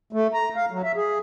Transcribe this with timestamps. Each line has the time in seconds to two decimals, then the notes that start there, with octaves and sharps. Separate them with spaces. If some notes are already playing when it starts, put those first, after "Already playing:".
0.13 A3
0.34 A#5
0.56 F5
0.71 F#3
0.83 E5
0.96 G#4